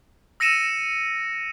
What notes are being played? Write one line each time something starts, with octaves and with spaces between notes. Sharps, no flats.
E6 A#6 C#7 D#7 E7